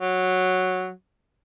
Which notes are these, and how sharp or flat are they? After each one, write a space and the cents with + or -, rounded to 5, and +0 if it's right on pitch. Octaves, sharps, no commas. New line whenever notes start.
F#3 -5